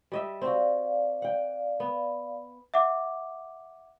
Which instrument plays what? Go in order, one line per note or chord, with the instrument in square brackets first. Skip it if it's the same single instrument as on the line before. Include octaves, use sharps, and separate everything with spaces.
[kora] G3 D#5 E5
[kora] C4 F#4 [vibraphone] D5 F5
[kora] F#5 G5
B3
[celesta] E5 F#5 D6